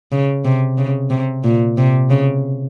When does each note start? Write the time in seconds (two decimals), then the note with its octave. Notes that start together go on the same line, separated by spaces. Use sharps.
0.12 C#3
0.45 C3
0.78 C#3
1.10 C3
1.44 A#2
1.77 C3
2.10 C#3